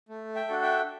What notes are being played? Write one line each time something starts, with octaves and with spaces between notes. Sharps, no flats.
A3
E5 G5
D4 F#4 A4
E5 G5